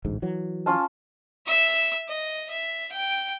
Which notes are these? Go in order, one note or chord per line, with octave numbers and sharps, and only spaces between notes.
A1 D2 G#2
E3 F#3
C#4 F4 A5
E5 E6
D#5
E5
G5